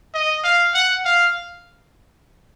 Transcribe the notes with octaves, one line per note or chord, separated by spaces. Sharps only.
D#5
F5
F#5
F5